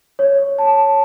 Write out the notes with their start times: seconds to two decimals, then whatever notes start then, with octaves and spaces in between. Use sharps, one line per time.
0.19 C#5
0.58 A5